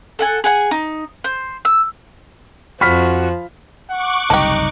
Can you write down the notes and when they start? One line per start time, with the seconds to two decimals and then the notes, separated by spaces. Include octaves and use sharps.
0.19 A4 F#5 G#5
0.44 G#4 F#5 G#5
0.71 D#4
1.24 C5
1.65 E6
2.81 F2 F3 F#4 B5 F6 B6
3.90 F#5 C#6 D6 F#6
4.30 F#1 C2 D#4 G4 A4